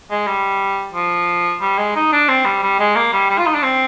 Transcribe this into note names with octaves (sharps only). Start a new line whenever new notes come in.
G#3
G3
F3
G3
G#3
D#4
D4
C4
G3
G3
G#3
A#3
G3
G3
F4
D#4
D4
C4